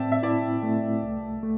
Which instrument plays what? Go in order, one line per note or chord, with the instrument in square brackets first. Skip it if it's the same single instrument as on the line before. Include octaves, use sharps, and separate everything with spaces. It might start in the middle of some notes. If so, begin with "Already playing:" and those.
Already playing: [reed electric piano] A2 C4 [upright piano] D5 E5 G5 A5
[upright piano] E5
[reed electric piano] E4 [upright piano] D5
[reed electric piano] A3
C2
A3